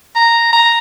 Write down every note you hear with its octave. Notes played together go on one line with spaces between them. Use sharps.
A#5
A#5